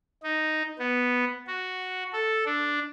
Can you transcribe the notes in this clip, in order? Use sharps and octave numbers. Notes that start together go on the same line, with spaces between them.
D#4
B3
F#4
A4
D4